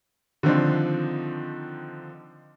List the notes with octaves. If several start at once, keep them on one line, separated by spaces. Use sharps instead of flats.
D3 D#3 F3 C4 D4 D#4